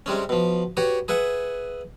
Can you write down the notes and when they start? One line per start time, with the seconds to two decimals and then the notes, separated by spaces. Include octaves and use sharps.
0.06 C3 G3 G#3 C#4
0.29 B2 F3
0.77 F#4 G4 B4 C#5
1.08 G#4 B4 E5 F#5 G#5